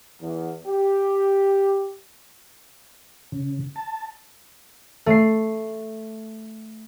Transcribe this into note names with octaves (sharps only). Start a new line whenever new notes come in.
E2
G4
C#3
A5
A3 C7